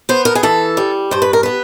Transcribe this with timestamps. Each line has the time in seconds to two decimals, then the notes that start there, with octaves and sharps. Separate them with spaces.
0.09 B3 C5
0.25 A#4
0.35 G#4
0.43 E3 A4
0.77 G3
1.11 G2 C5
1.22 B4
1.33 A#4
1.43 B3 B4